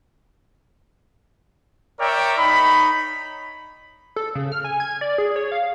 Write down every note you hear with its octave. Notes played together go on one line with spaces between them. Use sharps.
A#4 C#5 D5 E5 G5
D#4 C#5 B5
A4
C#3
F6
G#5
G#6
D5
G#4
C#5
F5